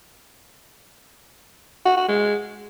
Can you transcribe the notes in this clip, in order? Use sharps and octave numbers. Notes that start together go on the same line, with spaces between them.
F#4
F#4
G#3